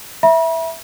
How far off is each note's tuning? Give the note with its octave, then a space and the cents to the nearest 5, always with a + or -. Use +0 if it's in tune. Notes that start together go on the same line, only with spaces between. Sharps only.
E5 +0 B5 -45